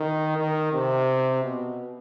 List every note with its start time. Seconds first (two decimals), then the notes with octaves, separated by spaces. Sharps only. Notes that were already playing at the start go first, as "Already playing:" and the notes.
Already playing: D#3
0.37 D#3
0.73 C3
1.43 B2